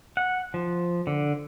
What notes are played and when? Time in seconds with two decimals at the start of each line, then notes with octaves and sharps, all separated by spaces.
0.17 F#5
0.54 F3
1.07 D3